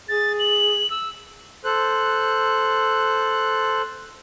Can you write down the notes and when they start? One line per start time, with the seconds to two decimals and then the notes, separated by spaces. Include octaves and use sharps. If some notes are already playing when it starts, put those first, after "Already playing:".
0.09 G#4 A6
0.39 F#7
0.91 E6
1.64 A4 C5 F#6